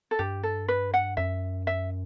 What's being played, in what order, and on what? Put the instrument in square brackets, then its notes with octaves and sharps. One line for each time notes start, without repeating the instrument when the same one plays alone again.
[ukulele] A4
[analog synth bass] G2 [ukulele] G4
[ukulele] A4
B4
F#5
[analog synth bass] F#2 [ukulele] E5
[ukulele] E5